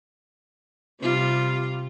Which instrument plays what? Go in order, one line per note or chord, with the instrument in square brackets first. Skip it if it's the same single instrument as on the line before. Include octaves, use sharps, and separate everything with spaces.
[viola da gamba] C3 G3 F4